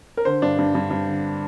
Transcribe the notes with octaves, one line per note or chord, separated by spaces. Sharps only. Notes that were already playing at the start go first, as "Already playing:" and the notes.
A#4
D3 C5
G2 D4
G2
G2
G2
D3